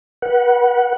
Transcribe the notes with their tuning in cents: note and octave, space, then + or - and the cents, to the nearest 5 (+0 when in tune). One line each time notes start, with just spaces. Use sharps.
B4 -35 F#5 +0